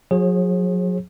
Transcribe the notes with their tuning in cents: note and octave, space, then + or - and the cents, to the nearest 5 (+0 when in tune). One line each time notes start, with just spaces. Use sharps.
F#3 -35 G#4 -10 C5 +45